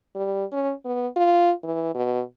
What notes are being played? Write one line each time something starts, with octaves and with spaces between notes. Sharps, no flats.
G3
C#4
B3
F4
E3
B2